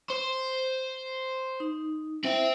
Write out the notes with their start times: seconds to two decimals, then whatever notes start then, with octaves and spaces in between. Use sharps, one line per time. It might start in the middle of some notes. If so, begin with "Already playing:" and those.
0.10 C5
1.60 D#4
2.24 C4 E4 C5 E5 G5